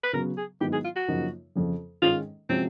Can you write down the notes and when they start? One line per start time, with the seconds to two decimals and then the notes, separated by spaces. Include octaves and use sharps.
0.03 B4
0.13 C#3 F#3 B3 A#4
0.37 G#4
0.61 G#2 D#3 F#3 B3 E4 G4
0.72 G#4
0.84 F4
0.96 F#4
1.08 F#2 C#3 F3 A#3 D#4
1.55 F2 C#3 F3
2.02 G#2 D#3 G#3 C#4 F4
2.49 C3 F3 G#3 C4 C#4 F#4